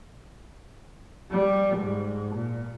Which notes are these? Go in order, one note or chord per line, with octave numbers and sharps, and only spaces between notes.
G3
G#2
A#2